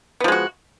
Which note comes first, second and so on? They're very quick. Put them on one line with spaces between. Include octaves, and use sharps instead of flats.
B3 F3 G#3 F#4